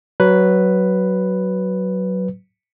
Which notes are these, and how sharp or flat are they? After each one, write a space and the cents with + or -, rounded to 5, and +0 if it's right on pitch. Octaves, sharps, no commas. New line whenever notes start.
F#3 +15 B4 +0